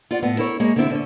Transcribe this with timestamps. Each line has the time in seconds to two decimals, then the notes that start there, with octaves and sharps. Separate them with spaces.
0.11 F4 D5 F#5
0.22 A2 B3 F4
0.38 E4 A4 A#4 C#5
0.60 G#3 A#3 G#4 C#5
0.76 D3 B3 C4 E4
0.91 D3 C#4